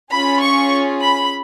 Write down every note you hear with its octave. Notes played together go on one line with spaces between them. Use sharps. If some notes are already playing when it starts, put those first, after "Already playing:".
C#4 F4 G#4 B5
C#6
B5